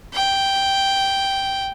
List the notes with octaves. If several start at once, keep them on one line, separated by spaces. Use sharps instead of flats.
G5